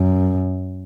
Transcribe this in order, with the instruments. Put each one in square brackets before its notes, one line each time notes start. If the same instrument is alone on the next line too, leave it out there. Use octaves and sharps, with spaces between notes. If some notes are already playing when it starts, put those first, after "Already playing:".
Already playing: [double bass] F#2